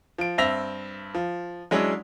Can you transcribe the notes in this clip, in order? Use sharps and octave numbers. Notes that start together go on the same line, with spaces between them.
F3 D7
G2 C4 E5 A#6 F7
F3
F#3 G#3 C#4 D4 E4